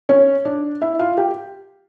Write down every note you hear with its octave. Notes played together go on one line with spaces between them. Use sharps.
C#4 C#5
D4 D5
E4 E5
F4 F5
G4 G5